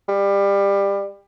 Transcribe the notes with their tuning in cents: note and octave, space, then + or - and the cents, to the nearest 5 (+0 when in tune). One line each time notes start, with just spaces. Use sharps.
G3 +25